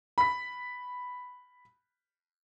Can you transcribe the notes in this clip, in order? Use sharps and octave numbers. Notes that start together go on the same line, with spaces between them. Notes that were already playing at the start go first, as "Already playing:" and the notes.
B5 B6